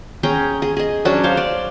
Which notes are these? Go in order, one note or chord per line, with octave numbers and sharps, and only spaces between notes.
C#4 G#4 G5 A#5
G#4
G#4 D#5
F#3 C#4 D4 F#4
C5 C#5 F5
D5